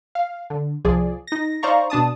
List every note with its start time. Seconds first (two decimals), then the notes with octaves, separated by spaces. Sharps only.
0.15 F5
0.50 D3
0.85 C2 F3 G#4 D5
1.27 D#4 A#6
1.63 D#4 C5 D5 F5 A#5 C#6
1.90 B2 D4 A5 D#6